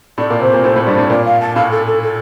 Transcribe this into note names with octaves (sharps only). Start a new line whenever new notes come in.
A2 A3 D5
A#2 A#3
C3 C4 C5
A#2 A#3
A2 A3 C5
A2 A3
G2 G3
A2 A3
A#2 A#3 D5
F5
A5
A2 A3 F5
A4
A4
A4